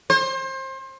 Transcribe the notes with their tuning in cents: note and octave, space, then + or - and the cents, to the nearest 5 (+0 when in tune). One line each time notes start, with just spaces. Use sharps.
C5 +30